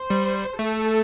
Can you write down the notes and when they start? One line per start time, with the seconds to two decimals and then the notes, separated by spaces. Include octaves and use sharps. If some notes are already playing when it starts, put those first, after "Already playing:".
Already playing: C5
0.10 G3
0.59 A3 A4